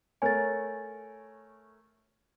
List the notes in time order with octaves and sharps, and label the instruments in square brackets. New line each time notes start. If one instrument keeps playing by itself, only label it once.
[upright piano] A3 A#4 C#5 [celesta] G#5 A6